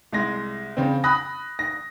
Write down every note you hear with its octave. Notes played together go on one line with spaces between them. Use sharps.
C2 G#3 A#6
C#3 C4
B5 D#6 F#6 A#6
A#6